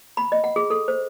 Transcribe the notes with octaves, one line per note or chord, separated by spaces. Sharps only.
B5
D#5
F#5
G#4
A4
C5